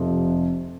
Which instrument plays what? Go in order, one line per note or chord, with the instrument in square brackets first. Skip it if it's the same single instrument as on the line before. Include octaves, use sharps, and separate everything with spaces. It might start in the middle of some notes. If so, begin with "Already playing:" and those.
Already playing: [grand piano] F1 F2 C3 F3